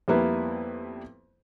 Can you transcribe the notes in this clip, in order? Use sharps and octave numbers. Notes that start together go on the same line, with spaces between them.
F2 G3 A#3 B3 E4 B4